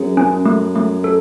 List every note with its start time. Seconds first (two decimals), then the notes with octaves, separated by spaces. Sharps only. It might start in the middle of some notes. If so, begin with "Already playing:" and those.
Already playing: F#2 G#4
0.17 C#4
0.46 A3
0.75 A3
1.04 A4